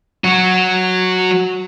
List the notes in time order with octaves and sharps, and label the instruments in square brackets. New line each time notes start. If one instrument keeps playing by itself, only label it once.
[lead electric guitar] F#3 F#4